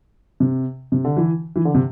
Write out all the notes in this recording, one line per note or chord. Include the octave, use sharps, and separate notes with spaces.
C3
C3
D3
E3
E3
D3
C3